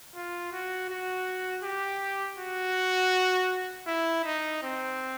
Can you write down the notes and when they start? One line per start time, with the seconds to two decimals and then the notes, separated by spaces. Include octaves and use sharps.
0.15 F4
0.53 F#4
0.90 F#4
1.64 G4
2.39 F#4
3.87 E4
4.24 D#4
4.63 C4